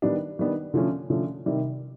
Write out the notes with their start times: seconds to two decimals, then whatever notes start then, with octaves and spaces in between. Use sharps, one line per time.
0.02 D#3 G3 B3 D4
0.39 D#3 G3 B3 D4
0.74 D3 F3 A3 C#4
1.10 D3 F3 A3 C#4
1.46 C3 D#3 G3